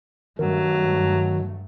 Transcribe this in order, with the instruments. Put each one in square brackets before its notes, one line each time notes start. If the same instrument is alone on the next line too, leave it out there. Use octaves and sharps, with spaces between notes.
[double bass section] G2 A3 [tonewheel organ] D#3 [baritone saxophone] F#3